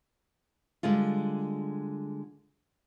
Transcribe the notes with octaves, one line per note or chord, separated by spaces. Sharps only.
D3 G3 G#3 F4